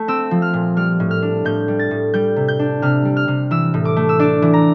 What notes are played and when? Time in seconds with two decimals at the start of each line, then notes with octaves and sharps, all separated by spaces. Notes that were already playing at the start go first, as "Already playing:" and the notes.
Already playing: A3
0.08 C4 E6
0.31 F3
0.42 F6
0.53 A#2
0.77 G3 F6
1.00 A2
1.11 F6
1.22 D4
1.45 A2 G6
1.68 G3
1.79 A6
1.91 A2
2.14 G3 G6
2.36 C3
2.48 G6
2.59 D4
2.82 C3 F6
3.05 G3
3.17 F6
3.28 C3
3.51 E3 E6
3.74 A2
3.85 D6
3.96 A3
4.09 E6
4.19 D4 D6
4.42 E3
4.54 A#5